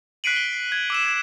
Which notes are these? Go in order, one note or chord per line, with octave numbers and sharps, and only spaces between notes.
F#6 B6 C7 D7 D#7 F#7
G7
C7
G#6
D6 E6 E7
G#6